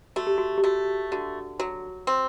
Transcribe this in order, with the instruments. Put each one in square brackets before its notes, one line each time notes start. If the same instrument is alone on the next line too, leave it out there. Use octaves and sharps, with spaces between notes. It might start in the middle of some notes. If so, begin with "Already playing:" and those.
[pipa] A3 [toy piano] F#4
[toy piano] G4
F#4
G4
[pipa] A3 [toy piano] F#4
[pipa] D3 [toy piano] F#4
[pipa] F#3 [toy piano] F#4
[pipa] C4